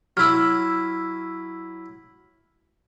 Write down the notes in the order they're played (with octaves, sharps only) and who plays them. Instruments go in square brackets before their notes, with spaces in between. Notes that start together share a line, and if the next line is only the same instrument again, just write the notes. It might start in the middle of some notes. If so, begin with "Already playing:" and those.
[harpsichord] F#3 E4 [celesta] E6 F6